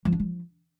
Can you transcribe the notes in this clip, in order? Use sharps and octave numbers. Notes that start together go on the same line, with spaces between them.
F3
D4
F3